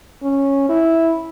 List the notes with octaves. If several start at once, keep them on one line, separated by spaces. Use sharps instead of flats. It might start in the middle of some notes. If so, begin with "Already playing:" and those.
C#4
E4